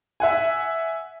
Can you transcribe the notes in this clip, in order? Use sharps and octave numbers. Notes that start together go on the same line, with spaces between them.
E5 F#5 G#5